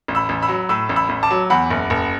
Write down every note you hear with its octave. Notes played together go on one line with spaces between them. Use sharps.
A1
B5 E6
A1
B5 E6
F#3
A2 B5 E6
A1
B5 E6
A1
A5 D6
F#3
E2 F#5 B5
F#1
F#1